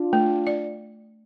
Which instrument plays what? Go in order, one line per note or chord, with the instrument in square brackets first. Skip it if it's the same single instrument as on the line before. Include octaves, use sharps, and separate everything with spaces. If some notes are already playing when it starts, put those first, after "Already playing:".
Already playing: [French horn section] D4 F4
[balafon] A3
D5